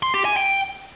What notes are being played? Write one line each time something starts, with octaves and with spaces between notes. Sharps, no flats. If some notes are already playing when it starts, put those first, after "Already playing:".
C6
G4
G#5
G5